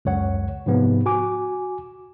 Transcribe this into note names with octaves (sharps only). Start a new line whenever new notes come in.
C#2 F#2 C#5 F#5
G#2 C3 F3 B3
F#4 G#5 D6